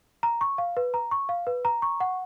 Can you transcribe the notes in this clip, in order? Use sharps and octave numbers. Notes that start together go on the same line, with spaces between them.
A#5
C#6
F5
B4
A#5
C#6
F5
B4
A#5
C#6
F#5